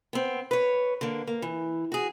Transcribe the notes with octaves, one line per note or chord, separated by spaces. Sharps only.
B3 C4
B4 C#5
D3 A#3
A#3
E3
F#4 G#4